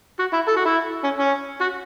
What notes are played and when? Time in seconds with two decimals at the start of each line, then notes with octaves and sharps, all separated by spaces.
0.19 F#4
0.33 E4
0.47 A4
0.56 F#4
0.65 E4
1.04 C#4
1.18 C#4
1.60 F#4